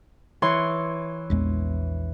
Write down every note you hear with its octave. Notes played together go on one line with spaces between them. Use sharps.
E3 C#5 C6
A#1 E2 G#3